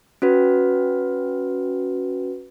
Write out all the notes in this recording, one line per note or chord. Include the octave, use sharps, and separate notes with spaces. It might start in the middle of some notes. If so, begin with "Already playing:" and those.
C#4 F#4 B4